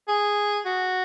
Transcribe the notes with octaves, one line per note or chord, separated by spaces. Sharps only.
G#4
F#4